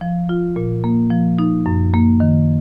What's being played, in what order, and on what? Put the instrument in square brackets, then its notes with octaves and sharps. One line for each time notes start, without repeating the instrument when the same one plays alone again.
[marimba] F3
F4
A#2
A#3
F3
D#4
F#2
A#3
D#3